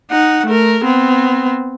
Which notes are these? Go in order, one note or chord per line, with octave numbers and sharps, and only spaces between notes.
D#4 F#5
A3 A#4
B3 C4